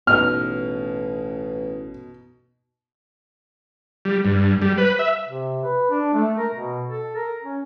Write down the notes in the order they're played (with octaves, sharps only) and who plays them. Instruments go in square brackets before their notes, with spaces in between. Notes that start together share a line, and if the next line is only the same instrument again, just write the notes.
[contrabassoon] A1 [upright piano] B2 D#4 [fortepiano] F6
[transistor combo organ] G3
G2
G3
B4
E5
[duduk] C3
B4
D4
A3
A#4
B2
A4
A#4
C#4